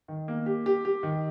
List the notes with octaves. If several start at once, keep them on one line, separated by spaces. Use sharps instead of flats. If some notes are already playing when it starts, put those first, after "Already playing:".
D#3
A#3
G4
G4
G4
D#3